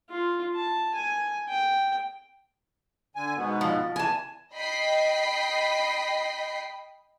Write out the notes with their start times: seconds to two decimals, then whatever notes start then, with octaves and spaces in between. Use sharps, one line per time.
0.10 F4
0.55 A5
0.95 G#5
1.49 G5
3.15 D3 G#5
3.36 G#2 B2 B3
3.61 F3
3.96 E3 G#5 A5
4.54 D#5 G5 B5 C7